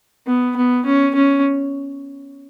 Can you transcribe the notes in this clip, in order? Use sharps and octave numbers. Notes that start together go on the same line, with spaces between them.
B3
B3
C#4
C#4